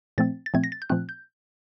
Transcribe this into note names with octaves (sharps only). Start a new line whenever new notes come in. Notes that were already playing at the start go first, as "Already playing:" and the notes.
A#2 F3 A3 C4 A6
A6
A#2 F3 A3 C4 G#6
A#6
A6
G6
A#2 F3 A3 C4 F#6
G6